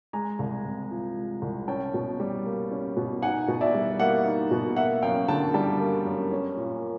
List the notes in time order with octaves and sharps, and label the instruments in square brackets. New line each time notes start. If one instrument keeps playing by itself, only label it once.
[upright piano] G#3 G#5 A#5
C2
C3
F3
G#3
C2
C#4 G5 A5
B2
G3
A#3
C#4
B2
D#4 F#5 G#5
B2
D5 E5
G3
A#3 E5 F#5
D#4
B2
A#3 E5 F#5
F#2 F5 G5
D3 G5 A5
G3 G5 A5
A#3
F#2
C#4
A#2